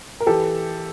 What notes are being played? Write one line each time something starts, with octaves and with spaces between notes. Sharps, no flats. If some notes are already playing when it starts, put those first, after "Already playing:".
A#4
E3 G4 A4